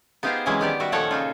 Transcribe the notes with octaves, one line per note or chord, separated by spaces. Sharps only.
B3 D#4 F4 G4 G#4 C5
C3 E3 F#3 G#3 C#4 E4
D#3 B3 G4 D5
G3 F#4 E5
A#2 D#3 F3 A4 C#5 F#5
C#3 D#4 F4